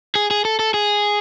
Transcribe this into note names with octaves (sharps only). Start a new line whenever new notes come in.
G#4
G#4
A4
A4
G#4